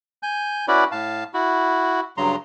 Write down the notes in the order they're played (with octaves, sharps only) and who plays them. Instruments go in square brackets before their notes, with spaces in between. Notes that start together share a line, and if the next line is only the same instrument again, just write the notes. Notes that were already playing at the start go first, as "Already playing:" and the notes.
[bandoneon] G#5 G6
C#4 E4 F#4 B4 D5
A2 F5 A5
E4 F#4
G2 C#3 F#3 A#5 C6